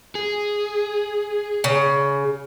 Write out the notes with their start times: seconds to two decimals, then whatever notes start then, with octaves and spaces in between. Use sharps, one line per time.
0.15 G#4
1.64 C#3